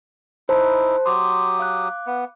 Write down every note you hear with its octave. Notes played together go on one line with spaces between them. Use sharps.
D#4 E4 C5 A5
F#3 G4 C6 D#6
F5 D6 F#6
B3